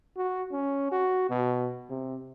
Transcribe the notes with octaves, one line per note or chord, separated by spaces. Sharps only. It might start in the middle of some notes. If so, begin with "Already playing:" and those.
F#4
C#4
F#4
B2
C3